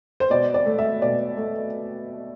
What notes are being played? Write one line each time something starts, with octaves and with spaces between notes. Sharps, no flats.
C5
B2 D5
D5
A3
E5
B2 D5
A3